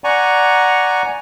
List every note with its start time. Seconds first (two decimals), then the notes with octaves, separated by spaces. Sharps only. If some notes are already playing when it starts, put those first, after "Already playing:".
0.04 D5 F#5 G#5 A#5 C#6